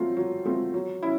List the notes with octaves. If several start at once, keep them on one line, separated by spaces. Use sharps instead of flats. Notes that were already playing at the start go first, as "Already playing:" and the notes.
Already playing: F#3 A3 C4 F4
F#3
A3 C4 F4
F#3
C#4 E4